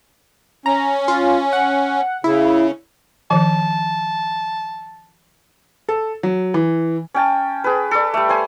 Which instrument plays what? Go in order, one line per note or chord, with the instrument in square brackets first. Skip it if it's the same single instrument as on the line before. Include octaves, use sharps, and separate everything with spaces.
[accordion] C#4 [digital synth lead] A#5
[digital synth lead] F4
F#5
[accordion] C#3 [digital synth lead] E4
[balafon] D#3 F3 [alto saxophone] A5
[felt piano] A4
F#3
E3
[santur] C#4 G5 A5
G#4 B4
A4 D5
G3 A3
C5 G#5